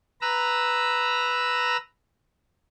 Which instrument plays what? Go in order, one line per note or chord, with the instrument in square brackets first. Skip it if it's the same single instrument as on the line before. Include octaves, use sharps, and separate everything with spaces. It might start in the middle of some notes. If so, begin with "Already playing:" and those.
[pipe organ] B4 A#5 E6